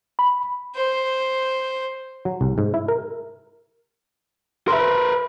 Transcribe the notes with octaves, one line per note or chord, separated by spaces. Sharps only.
B5
C5
F#3
C2
G#2
E4
A#4
A#4 B4 E5 C6